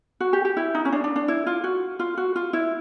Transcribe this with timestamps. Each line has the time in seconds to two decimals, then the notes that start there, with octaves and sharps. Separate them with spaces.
0.20 F#4
0.33 G4
0.45 G4
0.57 E4
0.75 D#4
0.85 C#4
0.92 D4
1.04 D4
1.16 D4
1.28 E4
1.46 F4
1.64 F#4
1.99 F4
2.17 F#4
2.36 F4
2.53 E4